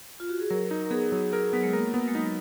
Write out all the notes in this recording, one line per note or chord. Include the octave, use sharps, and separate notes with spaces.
F4
F#4
G#4
F#3 A#4
D#4
A#4
B3 G#4
F#3
G#4 A#4
F#3 B3
G#3
A#3 A#4
B3
G#3
F#3 D#4